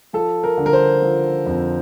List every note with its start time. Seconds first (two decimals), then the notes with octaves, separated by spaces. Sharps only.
0.13 F3 A4
0.43 A#4
0.58 D3
0.66 A#4
0.73 C5
1.02 F3
1.46 F2